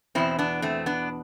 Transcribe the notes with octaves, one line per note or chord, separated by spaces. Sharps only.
E2 B2 C4 E4
B3 D4
A3 C4
B3 D4